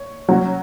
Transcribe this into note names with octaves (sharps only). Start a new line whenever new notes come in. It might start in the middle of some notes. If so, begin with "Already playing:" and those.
Already playing: C#5
F#3 C#4 F#4